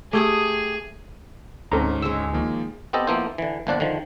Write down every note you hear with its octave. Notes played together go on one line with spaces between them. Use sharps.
A3 G4 G#4 G#5 D#6
D2 G#2 C4 C#4 A4 A#5
G#3 G#4 C#5 E6
D#3 F3 A#3
B3 C4 G4 A4 D#5
F3 A#3 B3 E4 C5
D3 E3
G1 A#2 F3 D4 D5 F#5
D3 D#3 F3